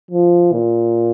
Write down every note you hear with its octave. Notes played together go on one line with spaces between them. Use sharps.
F3
A#2